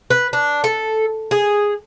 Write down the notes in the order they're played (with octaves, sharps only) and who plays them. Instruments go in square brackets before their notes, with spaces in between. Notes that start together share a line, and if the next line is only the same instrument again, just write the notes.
[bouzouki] B4
D4
A4
G#4